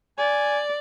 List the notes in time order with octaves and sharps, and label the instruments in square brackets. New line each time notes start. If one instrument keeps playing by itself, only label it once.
[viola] D5 [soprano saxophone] G#5